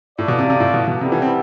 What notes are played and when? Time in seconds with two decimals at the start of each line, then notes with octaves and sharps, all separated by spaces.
0.18 A2 F4 A4 D5
0.28 B2
0.39 C3
0.50 C3
0.60 A2
0.74 B2
0.88 B2
1.01 C3 G3 B3 E4 A4
1.12 E3
1.22 C4